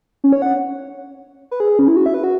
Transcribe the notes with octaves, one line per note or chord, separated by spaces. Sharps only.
C#4
C#5
F#5
B4
G#4
C#4
E4
F#4
E5
B4
F#4